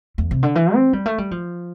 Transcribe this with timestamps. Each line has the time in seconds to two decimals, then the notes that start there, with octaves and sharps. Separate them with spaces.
0.18 E2
0.31 C3
0.43 D3
0.55 E3
0.74 C4
0.93 G3
1.06 A3
1.18 G3
1.31 F3